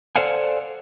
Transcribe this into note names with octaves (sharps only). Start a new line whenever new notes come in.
A4 C5 D5 F5 F#5 G#5